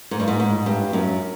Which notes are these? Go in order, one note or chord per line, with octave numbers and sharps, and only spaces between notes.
G#2
G2
G#2
G#2
G2
F#2